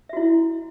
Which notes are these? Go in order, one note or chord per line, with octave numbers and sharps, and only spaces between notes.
E4 F#4 E5